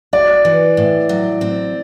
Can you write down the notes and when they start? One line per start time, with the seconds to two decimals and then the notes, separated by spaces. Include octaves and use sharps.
0.13 F#4 D5
0.45 E3
0.77 A2
1.09 F#3
1.41 C4